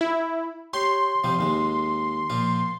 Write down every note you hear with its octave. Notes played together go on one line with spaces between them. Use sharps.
E4
G4 C#5 C6
C3 F3 G3
D#2 G#3
A#2 F3 F4